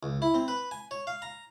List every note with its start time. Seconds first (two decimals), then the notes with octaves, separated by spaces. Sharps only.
0.03 C#2
0.22 E4
0.34 C4
0.48 B4
0.71 G#5
0.91 C#5
1.07 F5
1.22 A#5